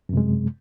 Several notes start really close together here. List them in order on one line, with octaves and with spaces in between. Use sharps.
F#2 C3 G#3